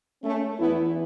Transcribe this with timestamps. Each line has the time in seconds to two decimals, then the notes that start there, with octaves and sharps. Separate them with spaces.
0.23 A3 C#4
0.60 E2 E3 B3 E4